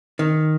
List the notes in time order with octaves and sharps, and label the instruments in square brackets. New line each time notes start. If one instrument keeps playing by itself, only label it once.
[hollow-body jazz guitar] D#3